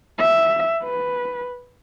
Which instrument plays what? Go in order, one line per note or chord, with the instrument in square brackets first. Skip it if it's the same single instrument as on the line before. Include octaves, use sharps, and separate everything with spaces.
[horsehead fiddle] E5
B4